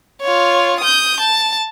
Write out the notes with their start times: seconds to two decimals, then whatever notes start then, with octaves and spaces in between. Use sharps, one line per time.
0.22 F4 C#5
0.80 D#6 G6
1.20 A5